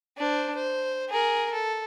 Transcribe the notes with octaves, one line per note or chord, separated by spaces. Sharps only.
D4 C5
C5
G#4 A#4
A4